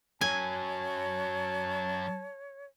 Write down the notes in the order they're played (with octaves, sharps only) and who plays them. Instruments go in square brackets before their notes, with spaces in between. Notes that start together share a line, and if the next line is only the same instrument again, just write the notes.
[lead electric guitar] F#2 F#3 [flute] C#5 [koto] G#5 [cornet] A5